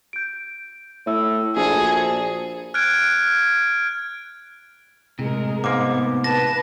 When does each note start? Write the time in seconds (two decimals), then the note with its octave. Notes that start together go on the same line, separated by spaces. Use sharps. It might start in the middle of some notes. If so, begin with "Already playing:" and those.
0.13 G6 D7
1.06 A2 C#5 E5 E6
1.56 A#1 F#4 G#4 A4 C5
2.74 F6 F#6 G#6 D7
5.19 A2 C3 G#3 A#4
5.64 G#2 A#3 B3 D6
6.24 B4 A5 A#6